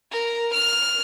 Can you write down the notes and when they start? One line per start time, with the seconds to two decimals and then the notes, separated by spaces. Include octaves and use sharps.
0.12 A#4
0.54 F6